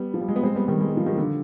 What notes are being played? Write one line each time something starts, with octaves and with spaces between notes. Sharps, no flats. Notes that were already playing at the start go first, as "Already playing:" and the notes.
Already playing: G3 B3
F3
G3
G#3
B3
G#3 C4
G3 B3
D#3 G3
G#3
G3
F3
D#3 G3
D3 F3